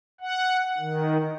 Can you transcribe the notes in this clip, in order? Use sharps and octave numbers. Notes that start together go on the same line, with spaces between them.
F#5
D#3